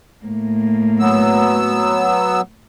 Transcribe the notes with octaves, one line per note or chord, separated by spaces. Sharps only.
A2 A#3
F#3 B3 E6